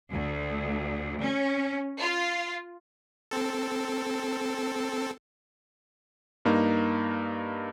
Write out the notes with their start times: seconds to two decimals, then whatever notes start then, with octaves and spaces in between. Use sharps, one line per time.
0.12 D2
1.23 C#4
2.00 F4
3.31 C4 A4
6.45 G2 A#3 D#4 A#5